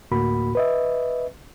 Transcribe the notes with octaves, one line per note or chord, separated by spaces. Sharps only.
D2 A2 A#3 F#4 B5
B4 D#5 E5